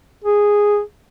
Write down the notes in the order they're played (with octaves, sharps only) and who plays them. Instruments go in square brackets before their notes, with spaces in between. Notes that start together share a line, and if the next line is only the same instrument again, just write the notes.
[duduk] G#4